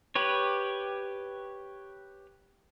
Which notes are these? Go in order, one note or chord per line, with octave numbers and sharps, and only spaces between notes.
G4 B4 C#5